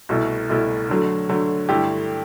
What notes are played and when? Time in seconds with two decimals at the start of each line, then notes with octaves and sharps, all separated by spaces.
0.09 C2 B2 A3 E4
0.49 C2 B2 A3 E4
0.89 D3 F#3 A3
1.29 D3 F#3 A3
1.69 G2 D3 A3 E4 G4